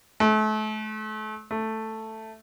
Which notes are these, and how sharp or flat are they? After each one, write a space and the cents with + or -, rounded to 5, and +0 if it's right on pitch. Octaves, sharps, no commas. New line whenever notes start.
A3 -35
A3 +5